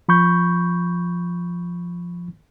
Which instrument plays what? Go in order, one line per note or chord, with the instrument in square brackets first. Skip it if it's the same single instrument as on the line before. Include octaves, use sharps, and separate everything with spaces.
[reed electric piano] F3 B5 C#6 G6